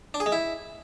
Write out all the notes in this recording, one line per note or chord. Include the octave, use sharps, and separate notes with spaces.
D4
G#4
G#3
E4